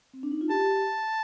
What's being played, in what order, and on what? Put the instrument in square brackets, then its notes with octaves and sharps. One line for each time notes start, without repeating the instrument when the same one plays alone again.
[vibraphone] C4
D4
D#4
F4
[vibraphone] G4 [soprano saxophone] A5